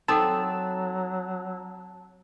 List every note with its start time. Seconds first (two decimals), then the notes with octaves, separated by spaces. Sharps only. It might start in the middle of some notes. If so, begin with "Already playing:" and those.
0.08 F#3 C4 D#4 A4 F#5 A5